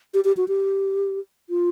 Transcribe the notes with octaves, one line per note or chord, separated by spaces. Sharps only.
G4
G4
F#4
G4
F4